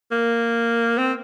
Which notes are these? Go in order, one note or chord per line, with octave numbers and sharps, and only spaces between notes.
A#3
C4